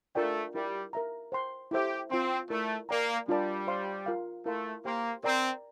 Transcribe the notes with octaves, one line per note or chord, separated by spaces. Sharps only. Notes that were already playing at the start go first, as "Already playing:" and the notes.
A3 D4 F4 A#4 D5 G5
G3 E4 G4 A#4 E5
A#4 E5 A#5
C5 G5 C6
E4 G4 A4 C5 E5
C4 F4 C5 G5 C6
A3 E4 A#4 D5
A#3 A#4 D5 G5 A#5
G3 D4 F4 A#4 D5 A5
C5 F5 C6
F4 A#4 F5
A3 E4 A#4 F5 C6
A#3 G4 C5 G5 C6
C4 A#4 D5 G5 A#5